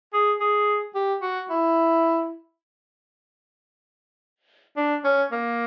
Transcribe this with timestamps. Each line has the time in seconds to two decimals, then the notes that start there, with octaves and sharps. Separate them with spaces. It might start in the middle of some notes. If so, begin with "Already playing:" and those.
0.13 G#4
0.40 G#4
0.95 G4
1.22 F#4
1.50 E4
4.76 D4
5.04 C#4
5.32 A#3